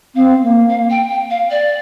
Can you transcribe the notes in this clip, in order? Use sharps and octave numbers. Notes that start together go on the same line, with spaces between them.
C4 F5
A#3
F5
G5
G5
F5
D5